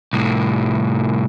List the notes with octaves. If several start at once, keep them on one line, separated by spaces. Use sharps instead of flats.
C2 A2